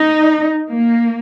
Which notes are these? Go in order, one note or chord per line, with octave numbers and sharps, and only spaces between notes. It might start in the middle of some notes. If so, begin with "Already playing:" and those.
Already playing: D#4
A#3